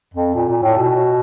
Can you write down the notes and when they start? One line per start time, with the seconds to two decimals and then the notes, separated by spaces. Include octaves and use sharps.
0.14 F2
0.35 A#2
0.49 A#2
0.62 A2
0.77 B2